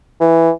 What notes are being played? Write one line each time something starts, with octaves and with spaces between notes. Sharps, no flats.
E3